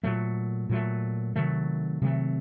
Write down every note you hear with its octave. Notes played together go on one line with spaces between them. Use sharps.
A#2 F#3 A3
A#2 F#3 A3
C3 D#3 F#3 A3
C3 D#3 F#3 A3